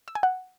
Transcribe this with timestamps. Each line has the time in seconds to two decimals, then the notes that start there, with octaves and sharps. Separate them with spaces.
0.08 E6
0.15 G#5
0.23 F#5